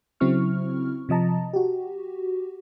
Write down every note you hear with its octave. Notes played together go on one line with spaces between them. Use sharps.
C#3 F#3 C4 E4 C#6 F6
C3 F3 D#5 A5 A#5
F#4 G4